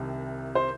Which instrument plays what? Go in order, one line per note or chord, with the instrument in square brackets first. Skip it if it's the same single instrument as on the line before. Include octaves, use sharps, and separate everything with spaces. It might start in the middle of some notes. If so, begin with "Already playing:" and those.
Already playing: [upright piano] C2 C3 D#3
C5